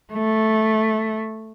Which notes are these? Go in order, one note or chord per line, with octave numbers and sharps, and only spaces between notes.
A3